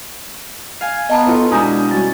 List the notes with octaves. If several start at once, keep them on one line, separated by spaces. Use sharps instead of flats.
F5 G#5
B3 D#5 A5 A#5
D#4 F4 A4 B4 C#5
B2 G#3 D4 E4 G#5 A#5 D#6 G6
G3 C#4 F#4 A6